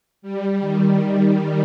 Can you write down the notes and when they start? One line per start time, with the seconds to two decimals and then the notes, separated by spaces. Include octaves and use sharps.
0.22 G3
0.60 D#3